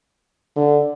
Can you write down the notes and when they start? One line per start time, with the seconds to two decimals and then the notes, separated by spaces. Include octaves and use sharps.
0.56 D3